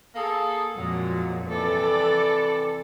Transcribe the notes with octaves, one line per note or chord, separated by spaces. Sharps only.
A#3 G#4 A4
F2 A#2 F#3 G#3
C3 E3 A4 D5